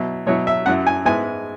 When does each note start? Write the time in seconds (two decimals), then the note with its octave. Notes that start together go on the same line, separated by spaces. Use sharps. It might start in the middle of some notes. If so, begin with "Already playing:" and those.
Already playing: B2 F#3 E4
0.26 B2 F#3 E4 C#5
0.47 E5
0.66 F#2 F#3 E4 F#5
0.87 G#5
1.05 G#2 G#3 B3 E4 G#5